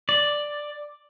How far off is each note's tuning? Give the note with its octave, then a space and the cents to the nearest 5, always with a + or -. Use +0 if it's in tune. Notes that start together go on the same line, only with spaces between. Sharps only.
D5 +5